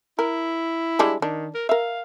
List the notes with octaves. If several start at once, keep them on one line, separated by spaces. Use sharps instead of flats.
E4 A#4
G3 G#3 D4
D#3 D4
A#4
A#4 E5 F5